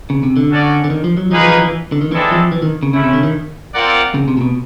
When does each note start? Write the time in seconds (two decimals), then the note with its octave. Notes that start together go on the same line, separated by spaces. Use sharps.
0.10 C#3
0.23 C3
0.37 D3
0.50 C#4 F#4 A4 D5
0.84 D3
0.90 D#3
1.04 F3
1.17 F#3
1.31 F3 A#3 D#4 G#4 B4
1.41 F3
1.52 F3
1.61 E3
1.92 D3
2.01 D#3
2.12 E3 G#3 C4 E4 A4 D5
2.32 F3
2.52 E3
2.62 D#3
2.83 C#3
2.93 C#3 A3 C#4 E4
3.03 C3
3.13 D3
3.23 D#3
3.74 C4 F4 A#4 D5 F#5
4.14 C#3
4.28 C3
4.37 A#2
4.41 B2